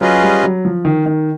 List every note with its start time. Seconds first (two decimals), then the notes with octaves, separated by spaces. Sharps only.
0.01 F#3 C#4 F4 G#4 B4 D#5
0.23 G3
0.43 F#3
0.65 F3
0.85 D#3
1.06 D#3